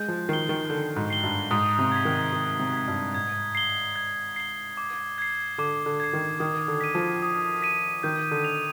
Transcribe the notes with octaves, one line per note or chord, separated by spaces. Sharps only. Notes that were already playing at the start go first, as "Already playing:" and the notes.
Already playing: G#3 G6
F3
D#3 C7 G7
D#3
D3 G6
G#2
C7 G7
G2
G#2 D#6
C3
G#6 B6
D#3
D#3 D#6
C3
G#6 B6
G2
G#2 G#6
C7 G7
G#6
C7 G7
D6
G#6 C7
D3 D6
D3
G#6 C7
D#3
D#3 D#6
D3
B6 D#7
F3
D#6
B6 D#7
D#3 G6
D3
B6 F7